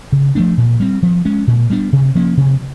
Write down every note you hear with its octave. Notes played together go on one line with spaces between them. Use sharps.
C#3
F3 A3 D4
A#2
G3 C4
F3
G#3 C#4
A#2
G3 B3 D4
C3
F3 A#3 C#4
C3